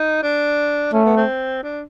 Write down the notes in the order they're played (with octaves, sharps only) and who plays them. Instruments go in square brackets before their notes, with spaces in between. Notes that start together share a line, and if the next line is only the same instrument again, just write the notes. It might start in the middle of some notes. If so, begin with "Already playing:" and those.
Already playing: [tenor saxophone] D#4
D4
[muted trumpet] A3 [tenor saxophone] C#4
[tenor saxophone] B3
C4
D4